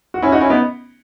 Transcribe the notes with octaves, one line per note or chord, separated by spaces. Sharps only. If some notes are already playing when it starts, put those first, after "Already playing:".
F#4
C#4 E4
D#4 F#4
C#4 E4
B3 D#4